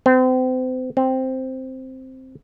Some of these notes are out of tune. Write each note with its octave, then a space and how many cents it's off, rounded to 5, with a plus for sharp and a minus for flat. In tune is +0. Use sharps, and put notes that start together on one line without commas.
C4 -35
C4 +0